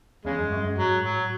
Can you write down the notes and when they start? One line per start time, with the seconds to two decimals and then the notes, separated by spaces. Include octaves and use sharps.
0.25 E2 C#3 G#3
0.39 F#2
0.52 F#2
0.64 F#2
0.78 G#2 F#3
1.04 A2 F#3